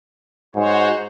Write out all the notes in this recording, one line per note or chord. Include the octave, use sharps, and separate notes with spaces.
G#2 F#4 C5 C#5